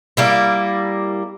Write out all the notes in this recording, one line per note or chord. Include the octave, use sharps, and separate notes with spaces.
G3 A#3 E4